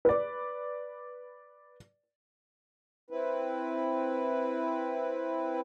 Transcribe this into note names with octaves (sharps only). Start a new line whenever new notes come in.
B4 D5
C4 E4 B4